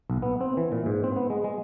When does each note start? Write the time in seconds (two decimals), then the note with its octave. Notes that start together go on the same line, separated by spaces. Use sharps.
0.10 B1
0.22 B3
0.41 C4
0.57 E3
0.72 A#2
0.86 G#2
1.04 C4
1.16 B3
1.30 G#3
1.44 G#3